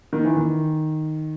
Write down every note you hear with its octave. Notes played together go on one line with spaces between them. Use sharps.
D#3
E3
D#3